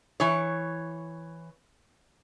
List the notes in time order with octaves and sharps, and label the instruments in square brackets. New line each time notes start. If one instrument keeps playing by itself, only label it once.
[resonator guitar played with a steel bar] E3 C#5